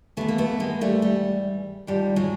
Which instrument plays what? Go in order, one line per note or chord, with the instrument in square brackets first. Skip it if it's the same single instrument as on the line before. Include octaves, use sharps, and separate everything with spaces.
[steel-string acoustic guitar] G#2 E3 A3 B3
A#3
A3 B3
G#3 A#3
G3 A3
G3
G#2 F3 G3
F#3 G#3